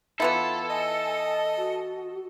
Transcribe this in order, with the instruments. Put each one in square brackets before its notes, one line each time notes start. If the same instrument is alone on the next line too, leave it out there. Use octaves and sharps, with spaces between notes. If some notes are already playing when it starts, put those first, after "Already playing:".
[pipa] E3 B3 E4 [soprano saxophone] F4 [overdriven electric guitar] A4
[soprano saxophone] D#5 [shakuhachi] G#5
[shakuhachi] F#4